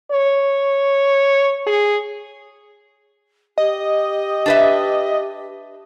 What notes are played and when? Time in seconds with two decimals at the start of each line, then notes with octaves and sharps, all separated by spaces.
0.12 C#5
1.67 G#4
3.58 G4 D#5
4.46 D4 B4 E5